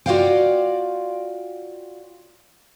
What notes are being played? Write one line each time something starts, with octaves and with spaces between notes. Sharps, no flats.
F4 F#4 C#5 D5 F5 G5